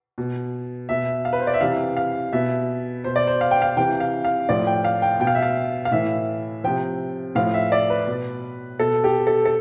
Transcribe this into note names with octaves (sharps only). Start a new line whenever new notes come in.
B2
B2 E5
F5
B4
C5
D5
E5
C3 E3 F5
F5
B2 E5
B2 C5
D5
C5
F5
G5
F5
C3 E3 G5
F5
F5
A2 F3 D5
G5
F5
G5
B2 G5
F5
E5
F5
F5
A2 E3 E5
C3 F3 G5
A2 F3 F5
E5
D5
B4
B2
B2 A4
G4
A4
A4